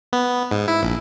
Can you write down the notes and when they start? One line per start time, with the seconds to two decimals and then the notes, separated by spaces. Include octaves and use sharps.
0.13 B3
0.51 G#2
0.68 E4
0.83 A#1